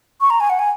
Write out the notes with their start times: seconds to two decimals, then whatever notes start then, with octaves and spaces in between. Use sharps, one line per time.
0.21 C#6
0.30 A#5
0.40 G#5
0.50 F#5
0.59 G#5